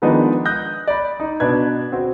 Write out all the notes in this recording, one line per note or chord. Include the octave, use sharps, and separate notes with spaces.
D#3 F3 G#3 B3 D4 D#4
D#6 F#6 G6 A#6
D5 B5
D#4
B2 D4 B4 G#6
C4 F#4